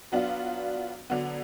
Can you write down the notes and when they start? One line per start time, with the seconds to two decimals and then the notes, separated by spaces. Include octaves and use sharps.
0.12 F#3 B3 D4 F4
1.10 D3 F#3 B3